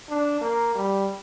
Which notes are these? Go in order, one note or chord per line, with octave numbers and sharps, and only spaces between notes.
D4
A#3
G3